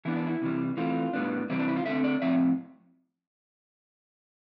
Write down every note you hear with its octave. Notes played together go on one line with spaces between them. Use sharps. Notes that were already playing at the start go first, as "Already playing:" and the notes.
E3 B3 D4 E4
D4
E4
C3 E3 G3
E3 A3 C4 F4
A2 G3 B3 D4
C3 E3 G3 C4 E4
D4
E4
F4
D3 A3 C4 E5
D5
A2 F3 C4 E5